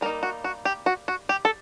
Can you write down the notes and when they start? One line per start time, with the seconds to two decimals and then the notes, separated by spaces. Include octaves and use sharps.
0.01 G3 A#3 D#4 A#4
0.23 F#4
0.44 F#4
0.65 G4
0.86 F#4
1.08 F#4
1.29 G4
1.45 A4